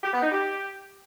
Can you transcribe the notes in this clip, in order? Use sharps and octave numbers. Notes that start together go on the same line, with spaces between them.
G4
B3
D#4
G4